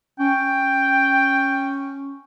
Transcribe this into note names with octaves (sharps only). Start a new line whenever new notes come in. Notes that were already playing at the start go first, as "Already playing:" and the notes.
C#4 G5